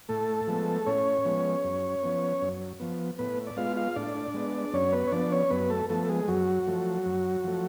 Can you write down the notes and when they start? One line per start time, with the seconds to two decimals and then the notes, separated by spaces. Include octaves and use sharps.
0.09 A2 A3 A4
0.47 F3 G#3 B3
0.86 A2 C#4 C#5
1.25 F3 G#3 B3
1.64 F#2
2.03 F3 B3
2.42 F#2
2.80 F3 B3
3.18 A2 B3 B4
3.47 D5
3.57 G#3 B3 F4 F5
3.76 F4 F5
3.96 A2 D4 D5
4.34 G#3 B3
4.73 F#2 C#4 C#5
4.93 B3 B4
5.07 C#5
5.12 F3 B3 D4 D5
5.31 C#4 C#5
5.50 F#2 B3 B4
5.70 A3 A4
5.90 F3 A3 B3 A4
6.04 A4
6.09 G#3 G#4
6.28 F#2 F#3 F#4
6.67 F3 A3
7.06 F#2
7.44 F3 A3